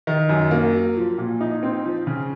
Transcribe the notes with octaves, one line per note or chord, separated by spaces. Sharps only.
D#3
F#2
A#3
F#3
F3
A#2
D#4
C4
F3
C#3